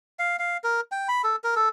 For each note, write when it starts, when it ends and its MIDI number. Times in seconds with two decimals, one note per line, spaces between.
0.19 0.36 77
0.39 0.57 77
0.64 0.81 70
0.92 1.08 79
1.09 1.22 83
1.24 1.36 69
1.44 1.55 70
1.56 1.69 69